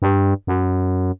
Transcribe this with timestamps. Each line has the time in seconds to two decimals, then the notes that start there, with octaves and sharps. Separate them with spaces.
0.02 G2
0.47 F#2